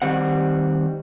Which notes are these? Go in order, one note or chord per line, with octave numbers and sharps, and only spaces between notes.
D#3 G3 C4 F#5